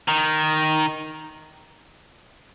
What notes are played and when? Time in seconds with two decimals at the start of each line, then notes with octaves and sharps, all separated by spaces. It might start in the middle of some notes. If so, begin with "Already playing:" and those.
0.08 D#3